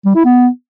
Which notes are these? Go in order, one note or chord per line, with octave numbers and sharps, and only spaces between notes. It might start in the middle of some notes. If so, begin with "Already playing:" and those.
G3
E4
B3